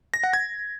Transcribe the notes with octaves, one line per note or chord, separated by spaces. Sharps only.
A#6
F#5
G#6